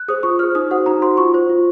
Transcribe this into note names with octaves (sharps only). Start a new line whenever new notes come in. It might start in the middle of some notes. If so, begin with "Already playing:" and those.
Already playing: F#6
G#4 C5 D#6
F4 C#6
G#4 C5 F6
D#4 D#6
F#4 C5 F#5
D#4 A#5
F#4 C5 C6
F4 C#6
C5
F4